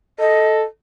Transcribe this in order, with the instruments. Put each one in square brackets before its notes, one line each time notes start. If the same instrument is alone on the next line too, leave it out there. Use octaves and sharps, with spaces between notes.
[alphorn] A4 [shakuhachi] D#5